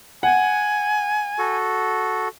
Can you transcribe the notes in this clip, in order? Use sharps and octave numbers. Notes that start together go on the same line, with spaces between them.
F#5 G#5
F#4 A4